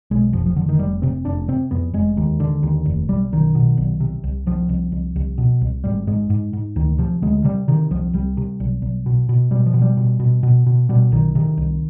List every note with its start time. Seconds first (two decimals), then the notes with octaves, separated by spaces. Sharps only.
0.11 B1 G#3
0.33 F1 F3
0.46 F3
0.56 F1 D3
0.69 D#3
0.79 F1 G3
1.02 C3 C4
1.25 F1 D4
1.48 C3 C4
1.71 F2 B3
1.94 F1 G#3
2.17 D#2
2.40 D3
2.63 D#2
2.86 F1
3.09 B1 G3
3.32 B1 D#3
3.55 B2
3.77 B1
4.00 C3
4.24 C2
4.46 C2 F3
4.69 C2
4.92 C2
5.16 C2
5.38 B2
5.61 C2
5.84 G#1 G3
6.07 G#2 G#3
6.30 G#2
6.53 G#2
6.76 D2 D#3
6.98 C3 F3
7.22 D2 G#3
7.44 C3 G3
7.68 C3 D#3
7.91 C2 F3
8.13 C2 G3
8.37 C3
8.60 B1
8.82 B1
9.06 B2
9.29 B2
9.51 B2 G3
9.66 F3
9.74 B2
9.82 G3
9.97 B2
10.20 B2
10.43 B2
10.66 B2
10.89 B2 G3
11.12 B1 D#3
11.35 C3 D#3
11.58 C2